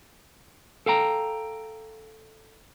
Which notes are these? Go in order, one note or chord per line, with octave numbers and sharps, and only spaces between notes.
A4 F5 G5 A#5